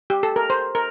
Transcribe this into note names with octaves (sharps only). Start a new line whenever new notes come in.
G4
A4
A#4
C5
A#4